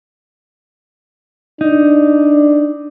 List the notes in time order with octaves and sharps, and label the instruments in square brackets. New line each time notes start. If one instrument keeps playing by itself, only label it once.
[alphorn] D4 [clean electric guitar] D#4